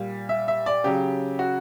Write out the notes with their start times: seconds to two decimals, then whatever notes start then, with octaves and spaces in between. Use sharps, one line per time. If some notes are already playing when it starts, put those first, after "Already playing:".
Already playing: A#2 G3
0.29 E5
0.48 E5
0.66 D5
0.84 C#3 F#3 G4
1.39 F#4